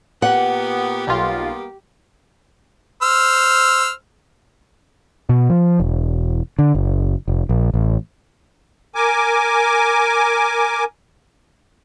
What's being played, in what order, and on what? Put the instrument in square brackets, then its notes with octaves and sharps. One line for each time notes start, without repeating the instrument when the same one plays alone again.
[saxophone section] A#2 A#3 B3 [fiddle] G4 [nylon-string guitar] F#5
[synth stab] B1 F4 [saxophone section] G3 A#3 B3
[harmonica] C5 E6 F6
[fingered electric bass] B2
F3
E1
D3
F#1
F1
A#1
A1
[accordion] A#4 G#5 D6